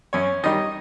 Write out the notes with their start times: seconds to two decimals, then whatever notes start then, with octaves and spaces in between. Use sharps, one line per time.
0.13 F#2 C#4 C#5
0.43 D#3 G3 D#4 D#5